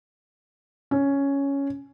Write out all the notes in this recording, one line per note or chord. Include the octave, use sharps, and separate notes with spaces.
C#4